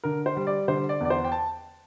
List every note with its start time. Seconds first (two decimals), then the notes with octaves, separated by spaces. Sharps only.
0.04 D3 A#4
0.26 C5
0.36 G3
0.47 D5
0.68 D3 C5
0.89 D5
1.01 E2 D5
1.10 C5
1.25 G5
1.32 A5